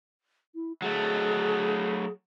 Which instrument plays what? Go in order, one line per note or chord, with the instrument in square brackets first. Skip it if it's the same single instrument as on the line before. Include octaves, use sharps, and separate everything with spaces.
[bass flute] E4
[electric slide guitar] F#3 A3 [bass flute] G#4